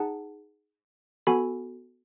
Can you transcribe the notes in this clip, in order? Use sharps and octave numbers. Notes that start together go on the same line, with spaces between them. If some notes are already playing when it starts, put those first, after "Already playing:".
Already playing: D#4 G#4 F#5 A5
B3 F#4 A4 G#5 B5